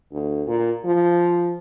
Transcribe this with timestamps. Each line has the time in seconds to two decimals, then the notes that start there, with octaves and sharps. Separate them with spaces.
0.12 D2
0.48 A#2
0.86 F3